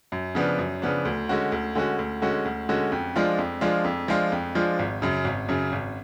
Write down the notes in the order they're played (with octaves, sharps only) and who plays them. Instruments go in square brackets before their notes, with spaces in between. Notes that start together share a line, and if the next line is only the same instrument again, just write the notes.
[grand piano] F#2
C#3 F3 B3 D4
F#2
C#3 F3 B3 D4
D2
D3 G#3 C#4 F#4
D2
D3 G#3 C#4 F#4
D2
D3 G#3 C#4 F#4
D2
D3 G#3 C#4 F#4
F2
F3 G#3 D4 F4
F2
F3 G#3 D4 F4
F2
F3 G#3 D4 F4
F2
F3 G#3 D4 F4
G#1
F#2 C#3
G#1
F#2 C#3
G#1